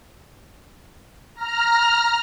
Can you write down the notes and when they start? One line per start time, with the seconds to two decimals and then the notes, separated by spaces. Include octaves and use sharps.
1.35 A#5 F6